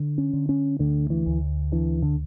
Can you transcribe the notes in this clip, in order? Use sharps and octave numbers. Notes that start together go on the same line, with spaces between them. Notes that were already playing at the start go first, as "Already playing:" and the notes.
Already playing: D3
C#4
D3
C#4
D2 D3
E3
D2
D3 E3
D3